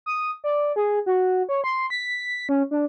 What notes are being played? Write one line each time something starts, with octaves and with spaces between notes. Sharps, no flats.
D#6
D5
G#4
F#4
C#5
C6
B6
C#4
D4